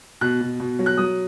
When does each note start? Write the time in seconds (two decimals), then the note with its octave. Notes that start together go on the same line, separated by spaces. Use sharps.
0.21 B2 F#6
0.41 B2
0.60 B2
0.79 F#3
0.86 F#6
0.98 F#3 D#6